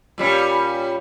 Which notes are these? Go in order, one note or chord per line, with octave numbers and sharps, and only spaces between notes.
A#2 G3 C#4